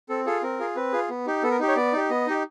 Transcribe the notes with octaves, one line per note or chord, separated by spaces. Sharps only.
C4 A4
F4 G#4 A4
C4 A#4
F4 G#4
C4 B4
F4 G#4
B3
D#4 G4
B3 A4
A#4
D#4 G4
C#5
B3 D5
D#4 G4
B3 D#5
D#4 G4